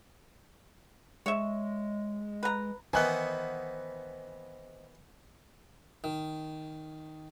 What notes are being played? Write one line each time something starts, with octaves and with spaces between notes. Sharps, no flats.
G#3 C#5 E5
B4 A#5
D#3 E3 B3 C5 D#5 F#5 G#5 F#6
D#3